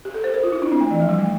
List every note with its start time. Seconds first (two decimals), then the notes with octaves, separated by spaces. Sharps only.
0.05 G4
0.14 A4
0.24 C5
0.34 A#4
0.43 F4
0.52 E4
0.62 D4
0.72 C4
0.81 A3
0.91 E3
1.00 F3
1.09 G3
1.18 A3